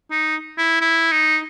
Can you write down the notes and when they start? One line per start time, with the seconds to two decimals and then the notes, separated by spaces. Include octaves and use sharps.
0.11 D#4
0.58 E4
0.81 E4
1.12 D#4